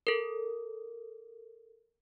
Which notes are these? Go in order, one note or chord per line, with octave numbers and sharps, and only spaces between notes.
A4 A#4